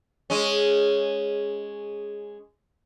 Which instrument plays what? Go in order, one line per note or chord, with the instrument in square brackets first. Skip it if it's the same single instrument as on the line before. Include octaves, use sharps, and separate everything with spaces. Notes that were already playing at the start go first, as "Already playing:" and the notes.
[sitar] G#3 C#4